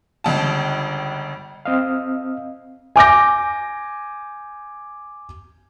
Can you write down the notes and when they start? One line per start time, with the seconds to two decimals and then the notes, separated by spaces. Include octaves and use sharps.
0.24 G1 C#2 A5
1.66 C4 D#5 F5
2.96 G#5 D6 G6 A#6